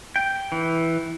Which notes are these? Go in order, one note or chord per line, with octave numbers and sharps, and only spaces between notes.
G5
E3